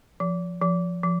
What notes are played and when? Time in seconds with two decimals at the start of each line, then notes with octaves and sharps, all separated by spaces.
0.20 F3
0.62 F3
1.03 F3